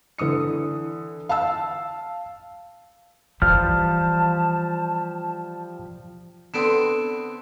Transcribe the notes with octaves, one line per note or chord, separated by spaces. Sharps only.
D3 E3 D#6 C#7
F5 A5 E6
E3 F3 G3 A5 F6
D3 B3 C4 A4 D7 E7